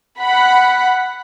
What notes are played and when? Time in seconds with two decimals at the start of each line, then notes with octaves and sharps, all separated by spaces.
0.19 F#5 B5